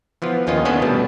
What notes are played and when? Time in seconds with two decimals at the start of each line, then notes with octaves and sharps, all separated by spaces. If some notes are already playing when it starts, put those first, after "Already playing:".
0.22 E3 F3 B3 F4
0.47 D#2 D#3 C#4 F4 D#5
0.65 D#3 B3 C#4 D4 A4 D#5
0.82 B2 G3 A3